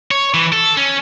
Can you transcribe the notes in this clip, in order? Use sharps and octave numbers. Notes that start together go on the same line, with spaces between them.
C#5
E3
A4
C#4